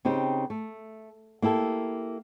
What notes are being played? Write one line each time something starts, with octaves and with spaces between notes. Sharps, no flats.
C#3 C4 D#4 G4
A3
A#3 E4 G4 A4